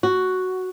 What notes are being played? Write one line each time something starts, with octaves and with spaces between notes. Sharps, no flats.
F#4